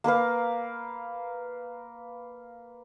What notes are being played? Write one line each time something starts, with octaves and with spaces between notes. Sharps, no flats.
A#3 A#4 B4 F5